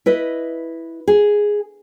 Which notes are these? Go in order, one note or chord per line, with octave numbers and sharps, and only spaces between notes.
E4 B4 D#5
G#4